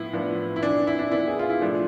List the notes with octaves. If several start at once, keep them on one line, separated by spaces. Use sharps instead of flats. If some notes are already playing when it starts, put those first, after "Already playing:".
Already playing: A2 F3 B3 E4
A2 F3 B3 D4
E4
E3 B3 D4
E4
D4
E3 B3 D4 E4
G#4
F4
E4
A2 F3 A3 D4